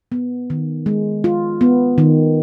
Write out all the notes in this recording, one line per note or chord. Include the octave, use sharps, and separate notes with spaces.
B3
D#3
G#3
F4
B3
D#3